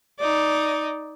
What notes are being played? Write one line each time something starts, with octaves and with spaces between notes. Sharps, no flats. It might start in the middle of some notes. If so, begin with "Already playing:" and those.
D#4 D5